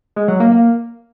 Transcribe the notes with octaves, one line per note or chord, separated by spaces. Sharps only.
G#3
F#3
A#3
A#3